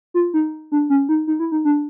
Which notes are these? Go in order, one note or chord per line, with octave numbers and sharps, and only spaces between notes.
F4
D#4
D4
C#4
D#4
D#4
E4
D#4
D4